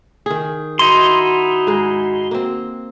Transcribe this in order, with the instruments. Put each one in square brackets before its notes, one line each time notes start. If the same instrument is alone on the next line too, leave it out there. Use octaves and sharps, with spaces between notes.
[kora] D#3 G#4
[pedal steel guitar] D#4 E4 C6 [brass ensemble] F#4
[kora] G#2 G#3
A#3 C4